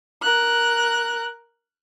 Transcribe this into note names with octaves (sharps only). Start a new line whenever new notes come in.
A#4 F#6